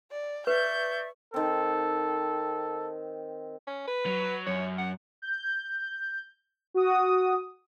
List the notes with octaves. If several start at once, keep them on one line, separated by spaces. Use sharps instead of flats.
D5
B4 D5 E5 C#6 G6
D#3 C4 A4
C#4
B4
F#3
F#2 C#5
F#5
G6
F#4 D#6